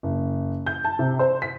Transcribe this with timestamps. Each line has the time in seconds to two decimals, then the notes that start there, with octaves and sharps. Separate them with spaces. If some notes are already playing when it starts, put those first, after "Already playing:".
0.03 F#1
0.66 G6
0.84 A5
0.99 C3
1.19 C5
1.42 B6